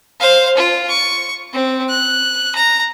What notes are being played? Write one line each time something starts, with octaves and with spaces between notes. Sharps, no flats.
C5 F5
F4
C#6
C4
F#6
A#5